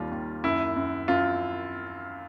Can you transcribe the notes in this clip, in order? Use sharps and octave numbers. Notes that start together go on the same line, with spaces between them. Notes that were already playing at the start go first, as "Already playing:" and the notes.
Already playing: D#2 D#3 G3 F4
D#2
F#2 E4
F#2
F#2 F4